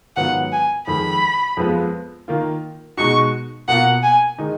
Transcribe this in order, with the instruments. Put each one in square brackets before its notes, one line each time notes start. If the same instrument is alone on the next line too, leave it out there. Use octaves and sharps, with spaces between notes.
[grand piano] G#2 D#3 F#3 B3 F4 [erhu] F#5
[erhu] G#5
[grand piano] F2 D#3 G#3 [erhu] B5
[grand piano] F2 F3 G#3 B3 F4
D#3 A#3 F4
[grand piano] B2 G#3 D#4 F#4 [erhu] C#6
[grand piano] B2 A#3 F4 [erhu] F#5
[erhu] G#5
[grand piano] D#3 G#3 D#4